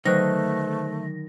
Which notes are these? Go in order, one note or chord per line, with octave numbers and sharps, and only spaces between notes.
D3 D#3 F#3 A3 B4 C5 F#6 A#6